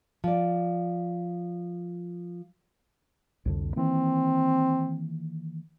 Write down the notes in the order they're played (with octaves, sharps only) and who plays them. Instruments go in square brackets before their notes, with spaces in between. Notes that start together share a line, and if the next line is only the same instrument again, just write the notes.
[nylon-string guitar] F3 D5
[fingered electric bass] C2 F2 D3
[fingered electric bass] D#3 E3 A#3 [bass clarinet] C4